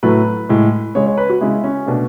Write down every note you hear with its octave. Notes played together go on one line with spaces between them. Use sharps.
A2 F#3 A3 B4
A2 G#3
C#3 G#3 C#5
C#5
B4
F#4
C#3 G#3 E4
C#4
B2 A3 D4